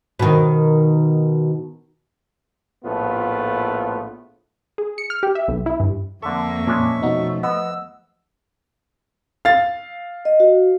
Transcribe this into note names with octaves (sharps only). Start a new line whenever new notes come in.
B2 D#3
A#1 A2 A3 B3 F4
G#4
C#7
F6
G4
E5
B1
E4
G2
F2 D3 A#3 A4 E5 C#6
A#2 G#3 C#4 D4
B2 F3 A3 D#4 F#4
B3 D#5 F#5 E6
F5 A6
D#5
F#4